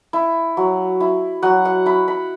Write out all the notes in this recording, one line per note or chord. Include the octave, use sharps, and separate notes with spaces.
E4
F#3
E4
F#3 F#5
F#5
E4 B5
B5